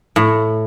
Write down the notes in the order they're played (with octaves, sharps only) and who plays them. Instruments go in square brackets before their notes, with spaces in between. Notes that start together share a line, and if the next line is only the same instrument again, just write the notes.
[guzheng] A2